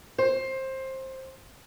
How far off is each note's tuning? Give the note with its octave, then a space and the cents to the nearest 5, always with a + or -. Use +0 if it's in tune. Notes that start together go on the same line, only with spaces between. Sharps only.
C5 +20